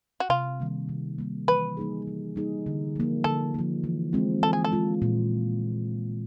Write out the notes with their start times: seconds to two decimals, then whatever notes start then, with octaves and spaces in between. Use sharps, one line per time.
0.20 F#4
0.30 C3 F4
0.60 D#3 G3 A#3
0.89 C3
1.18 D#3 G3 A#3
1.48 E3 B4
1.77 G3 A#3 D#4 G#4
2.07 E3
2.36 G3 A#3 D#4 G#4
2.66 D3
2.96 F3 A#3
3.24 D3 A4
3.54 F3 A#3
3.84 E3
4.13 G#3 C4 F4
4.43 E3 A4
4.53 G#4
4.64 A4
4.72 G#3 C4 F4
5.02 A#2